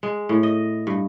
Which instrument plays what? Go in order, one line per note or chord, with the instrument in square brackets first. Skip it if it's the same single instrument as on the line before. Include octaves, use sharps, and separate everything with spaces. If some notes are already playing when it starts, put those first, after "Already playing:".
[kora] G#3
A2
D#5
G2